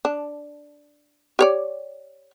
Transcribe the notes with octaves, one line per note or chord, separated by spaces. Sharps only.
D4
G4 C#5 D5